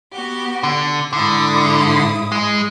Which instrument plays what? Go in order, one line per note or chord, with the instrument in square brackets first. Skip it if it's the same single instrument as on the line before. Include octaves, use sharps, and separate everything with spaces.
[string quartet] B3 F#4 G4
[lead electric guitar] D3
[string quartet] G#2 E4 D#6 [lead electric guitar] D3
[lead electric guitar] G#3